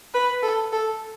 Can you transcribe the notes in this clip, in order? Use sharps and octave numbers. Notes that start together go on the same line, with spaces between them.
B4
A4
A4